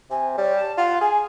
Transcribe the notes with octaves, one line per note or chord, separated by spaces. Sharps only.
C3 G#5
G3 C#5
A5
F4 F#5
G#4 G#5